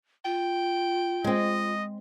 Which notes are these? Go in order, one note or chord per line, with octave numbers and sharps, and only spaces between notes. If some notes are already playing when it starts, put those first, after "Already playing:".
F4 G5
G#3 C4 D#5